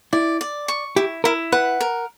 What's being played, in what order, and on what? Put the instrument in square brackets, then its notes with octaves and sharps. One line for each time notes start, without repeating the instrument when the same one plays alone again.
[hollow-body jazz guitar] E4 [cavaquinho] D5
[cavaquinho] D5
C#6
[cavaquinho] E4 [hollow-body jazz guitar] G4
[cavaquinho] E4 [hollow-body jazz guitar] A#4
[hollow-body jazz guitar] B4 [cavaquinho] F#5
[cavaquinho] A#4